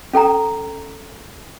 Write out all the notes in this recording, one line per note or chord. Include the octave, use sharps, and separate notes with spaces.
C#4 A4 G5 A#5